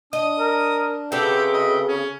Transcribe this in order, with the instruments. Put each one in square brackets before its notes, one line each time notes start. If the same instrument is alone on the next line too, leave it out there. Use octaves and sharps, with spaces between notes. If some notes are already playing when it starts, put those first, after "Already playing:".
[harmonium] D4 [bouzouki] D#5 [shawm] D#6
[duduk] A#4
[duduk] C#3 [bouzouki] C4 F#4 A4 [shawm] G4 [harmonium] B4 E5 G5
[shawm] D#5
C#4